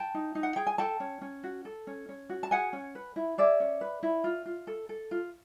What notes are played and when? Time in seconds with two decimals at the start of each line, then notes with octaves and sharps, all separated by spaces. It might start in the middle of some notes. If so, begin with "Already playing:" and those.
Already playing: G5 A5
0.14 D#4
0.35 D#4
0.43 F#5
0.56 G#4 G5
0.67 G#5
0.78 A4 G5 A5
1.00 C#4
1.21 C#4
1.43 F#4
1.65 A4
1.87 C#4
2.09 C#4
2.29 F#4
2.43 A5
2.51 G#4 F#5 G#5
2.73 C#4
2.95 B4
3.16 E4
3.38 G#4 D5 E5
3.60 C#4
3.81 B4
4.03 E4
4.24 F4
4.46 F4
4.67 A4
4.89 A4
5.11 F4